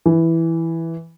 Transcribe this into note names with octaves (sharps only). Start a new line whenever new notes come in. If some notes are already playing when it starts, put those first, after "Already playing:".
E3